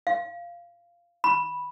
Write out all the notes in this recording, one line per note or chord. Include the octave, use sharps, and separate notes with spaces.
F5
B5